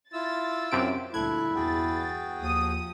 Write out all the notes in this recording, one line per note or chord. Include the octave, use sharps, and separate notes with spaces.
E4 F4 E6 A6
F#2 C3 D7
D2 G2 A#2 E4 A4 F#6 G#6
E2 F#4 G#4 G5 A6
D#2 F3 D#6